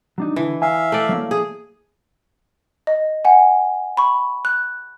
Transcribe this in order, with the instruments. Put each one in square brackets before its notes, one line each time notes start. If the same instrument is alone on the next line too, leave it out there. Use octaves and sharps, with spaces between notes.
[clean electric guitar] F#3 D4 D#4
[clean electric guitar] D3 [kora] E3
[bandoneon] E5 F5 [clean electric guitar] G#5
[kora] A3 D5
[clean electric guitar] F#3 A#3
[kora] G#4
[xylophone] D#5
F#5 G#5
B5 C#6
F#6